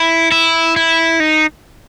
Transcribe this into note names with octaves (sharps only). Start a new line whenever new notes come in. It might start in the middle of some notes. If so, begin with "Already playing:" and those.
Already playing: E4
E4
E4
D#4